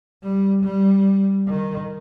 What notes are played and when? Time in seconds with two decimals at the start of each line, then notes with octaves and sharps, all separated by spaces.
0.22 G3
0.64 G3
1.47 D#3